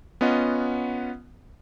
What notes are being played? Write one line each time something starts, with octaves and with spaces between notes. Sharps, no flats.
B3 C#4 F4 D#5 F#5